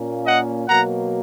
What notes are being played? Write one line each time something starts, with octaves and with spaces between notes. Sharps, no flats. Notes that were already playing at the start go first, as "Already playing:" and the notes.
Already playing: A#2 A#3 C#4
D#5 F#5
B2 F#3 A#3 F#5 A#5